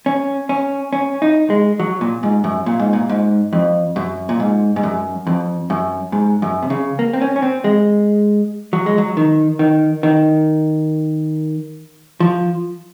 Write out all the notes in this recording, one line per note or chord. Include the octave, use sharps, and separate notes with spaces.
C#4
C#4
C#4
D#4
G#3
F#3
A#2
G#2
F#2
A#2
G#2
A#2
G#2
F2
F#2
A#2
G#2
G#2
F#2
F2
F#2
G#2
F#2
C3
C#3
A#3
C4
C#4
C#4
C4
G#3
F#3
G#3
F#3
D#3
D#3
D#3
F3